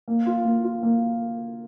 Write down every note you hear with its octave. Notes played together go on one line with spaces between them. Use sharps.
A#3
F4
A#3
F4
A#3